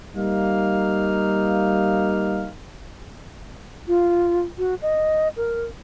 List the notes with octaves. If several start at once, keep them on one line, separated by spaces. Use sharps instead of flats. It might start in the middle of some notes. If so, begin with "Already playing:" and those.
G3 A#3 D#4 F5
F4
F#4
D#5
A#4